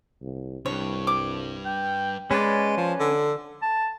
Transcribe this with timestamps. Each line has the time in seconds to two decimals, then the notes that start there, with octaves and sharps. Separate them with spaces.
0.22 C2
0.66 C2 G2 C#5
1.07 D6
1.65 G5
2.31 G#3 C#4 B4 D5
2.77 F3
3.00 D3
3.62 A5